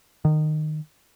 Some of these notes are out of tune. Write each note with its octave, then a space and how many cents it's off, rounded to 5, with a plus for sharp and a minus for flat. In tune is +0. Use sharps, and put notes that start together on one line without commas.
D#3 -20